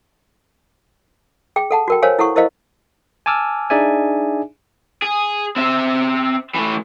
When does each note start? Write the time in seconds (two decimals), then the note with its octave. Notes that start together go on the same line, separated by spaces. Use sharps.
1.56 G#4 G5
1.71 A4 F#5 A5
1.88 F#4 A#4 G5
2.02 A#4 C5 C#5 F5 G#5
2.19 E4 A4 F#5 C#6
2.36 E4 A#4 C5 D#5 F5
3.26 G#5 A5 D6 E6 F6
3.70 D4 D#4 G#4 D5 E5 G#5
5.02 G#4
5.56 C4 E5
6.54 E3 A3